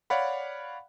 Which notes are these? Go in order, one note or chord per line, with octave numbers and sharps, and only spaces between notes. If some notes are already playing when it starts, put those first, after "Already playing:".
C#5 D5 F5 F#5 B5